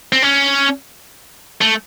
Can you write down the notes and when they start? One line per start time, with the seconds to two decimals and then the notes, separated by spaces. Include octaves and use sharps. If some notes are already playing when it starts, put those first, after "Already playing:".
0.12 C4
0.22 C#4
1.61 A3